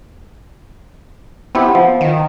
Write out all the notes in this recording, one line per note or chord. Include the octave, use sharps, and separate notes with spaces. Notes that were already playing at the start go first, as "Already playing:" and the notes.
B3 C4 E4 G4
F3
D#3